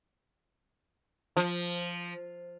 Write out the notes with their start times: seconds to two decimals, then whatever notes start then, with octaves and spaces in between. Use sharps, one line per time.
1.37 F3